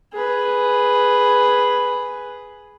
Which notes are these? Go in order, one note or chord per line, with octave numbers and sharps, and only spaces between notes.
G#4 B4